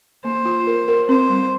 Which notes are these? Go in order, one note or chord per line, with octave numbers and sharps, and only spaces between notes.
A#3 C5
F4
A#4
A#4
C4 C5
G3